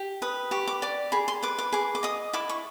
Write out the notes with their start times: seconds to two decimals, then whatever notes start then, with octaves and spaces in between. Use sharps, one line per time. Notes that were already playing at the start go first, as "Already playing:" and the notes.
Already playing: G4
0.22 B4 D#6
0.51 G4 C#6
0.68 D6
0.82 D5 D6
1.12 G#4 B5
1.28 C6
1.43 B4 D6
1.59 D6
1.72 G#4 D6
1.95 D6
2.03 D#5 D#6
2.33 E4 D6
2.49 C#6